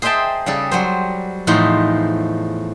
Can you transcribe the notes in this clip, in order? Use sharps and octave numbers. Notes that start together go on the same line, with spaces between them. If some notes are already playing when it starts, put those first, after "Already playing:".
G#4 C5 D#5 E5 G5 A5
C#3 G3 G#4 A4
F#3 G3 C5
E2 A2 F3 D#4 C5